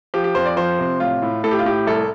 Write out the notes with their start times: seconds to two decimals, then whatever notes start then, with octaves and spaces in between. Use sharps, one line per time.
0.14 F3 G4
0.24 G4
0.35 F2 C5
0.46 D5
0.56 F3 C5
0.79 C3
1.00 A1 F4
1.22 A2
1.44 A2 A4
1.51 G4
1.59 F4
1.65 A2 G4
1.87 C2 A4